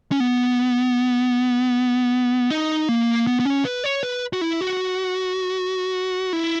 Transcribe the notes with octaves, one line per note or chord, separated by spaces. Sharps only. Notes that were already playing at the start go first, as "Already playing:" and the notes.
C#4
B3
D#4
A#3
B3
B3
C#4
B4
C#5
B4
F#4
E4
F#4
E4